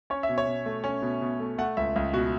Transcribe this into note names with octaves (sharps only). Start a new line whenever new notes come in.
C#4 C#5
E5
B2
C#5
B2
A3
C#4
B2
B2
A3
A3 F#5
C#2 E5
C#2
B2 F#4